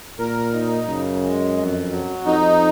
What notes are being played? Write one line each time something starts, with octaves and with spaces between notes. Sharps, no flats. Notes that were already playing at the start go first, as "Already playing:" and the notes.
A#2 A#4
D#4
F#2 C#3
G#3
F2
F#3
F2 D#4